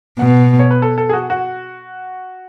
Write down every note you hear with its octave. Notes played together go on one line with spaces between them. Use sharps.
B2 F#5
C#5
B4
A4
A4
G#4
F#4
F#4